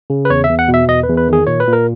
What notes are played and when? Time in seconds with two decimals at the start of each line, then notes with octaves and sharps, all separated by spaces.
0.10 C#3
0.25 B4
0.30 E2 C#5
0.44 E5
0.50 E2
0.59 F#5
0.68 B2
0.74 E5
0.88 E2 D#5
1.03 B4
1.09 E2
1.17 B4
1.28 D#3 G#4
1.47 A#2 C#5
1.60 B4
1.67 A#2
1.73 A#4